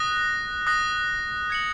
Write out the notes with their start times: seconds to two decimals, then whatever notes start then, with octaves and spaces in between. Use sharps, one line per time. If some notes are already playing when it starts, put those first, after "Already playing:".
Already playing: D#6 F#6 A#6
0.67 D#6 F#6 A#6
1.50 G#6 C#7 F#7